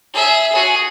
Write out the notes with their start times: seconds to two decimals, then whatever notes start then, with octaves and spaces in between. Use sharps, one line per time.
0.13 G#4 E5
0.52 F#4 G#4